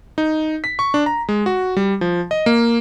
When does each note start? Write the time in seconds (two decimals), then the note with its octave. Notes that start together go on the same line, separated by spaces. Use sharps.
0.18 D#4
0.64 B6
0.79 C#6
0.94 D4
1.06 A#5
1.29 G#3
1.46 F#4
1.77 G3
2.01 F3
2.31 D#5
2.46 A#3